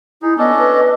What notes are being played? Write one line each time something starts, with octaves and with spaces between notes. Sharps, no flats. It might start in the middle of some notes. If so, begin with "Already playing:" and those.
D#4 E4 G#4
B3 C#4 D4 A4 D#5
B4